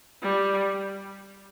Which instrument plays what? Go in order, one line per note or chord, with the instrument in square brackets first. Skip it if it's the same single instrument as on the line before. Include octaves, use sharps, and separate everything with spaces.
[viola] G3